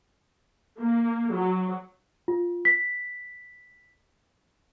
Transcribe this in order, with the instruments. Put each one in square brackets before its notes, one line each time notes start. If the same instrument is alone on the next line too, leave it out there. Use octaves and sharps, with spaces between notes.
[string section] A#3
F#3
[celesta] F4
B6